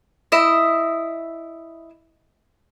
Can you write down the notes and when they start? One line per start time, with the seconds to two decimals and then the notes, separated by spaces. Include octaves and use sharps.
0.32 E4 D#5 E5